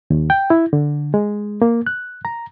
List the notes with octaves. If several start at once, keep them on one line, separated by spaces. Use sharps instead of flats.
D#2
G5
E4
D3
G#3
A#3
F#6
A#5